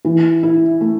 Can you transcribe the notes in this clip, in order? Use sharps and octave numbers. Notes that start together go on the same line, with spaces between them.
E3
E4
A3